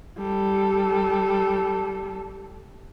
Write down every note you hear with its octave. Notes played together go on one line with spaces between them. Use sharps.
G3 A4